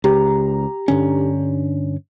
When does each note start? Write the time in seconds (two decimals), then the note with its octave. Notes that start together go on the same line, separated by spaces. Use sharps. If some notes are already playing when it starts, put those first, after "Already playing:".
0.04 C#2 G4 A#5
0.88 G2 D3 C#4